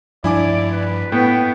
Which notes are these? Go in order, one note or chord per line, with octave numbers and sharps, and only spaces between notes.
G2 F3 D4 E4 D5 G#5 D6
B4
A2 B3 G5